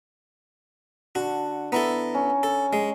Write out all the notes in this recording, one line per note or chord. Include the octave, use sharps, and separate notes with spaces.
D3 F#4
B3 E4 A4 A#5
C#4
A4
G#3